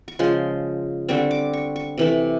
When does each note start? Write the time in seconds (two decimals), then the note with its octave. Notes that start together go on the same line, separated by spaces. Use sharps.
0.08 C#6
0.19 C#3 F3 G#3 C6
1.08 D3 G3 C4 C#6
1.31 D6
1.53 C#6
1.76 C#6
1.98 C3 E3 A3